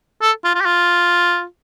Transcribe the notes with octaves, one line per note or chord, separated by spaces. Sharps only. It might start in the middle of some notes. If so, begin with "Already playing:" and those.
A4
F4
F4
G4
F4